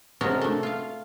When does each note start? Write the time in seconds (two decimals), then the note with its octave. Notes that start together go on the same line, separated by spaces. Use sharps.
0.21 C3 G#3 C#4 D4 F#4 A#4
0.41 A3 D4
0.63 F4 F5